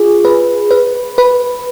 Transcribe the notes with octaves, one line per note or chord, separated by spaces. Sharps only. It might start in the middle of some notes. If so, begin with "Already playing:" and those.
Already playing: F4 G#4
B4
B4
B4